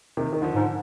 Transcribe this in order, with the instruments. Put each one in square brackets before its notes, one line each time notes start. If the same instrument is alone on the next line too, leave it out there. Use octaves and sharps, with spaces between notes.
[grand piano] C3 D#3
D#3
D3 F3
[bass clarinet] G#2